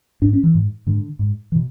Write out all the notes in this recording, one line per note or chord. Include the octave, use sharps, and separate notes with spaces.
G#2 D4
C#4
E3
G#2
G#2 D3
G#2
E3
B2